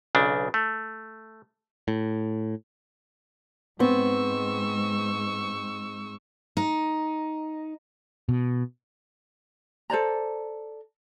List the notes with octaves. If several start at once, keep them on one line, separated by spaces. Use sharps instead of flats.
B1 C#3 D4
A3
A2
G#2 B3 C4 C#6 E6
D#4
B2
A4 C5 D5 A#5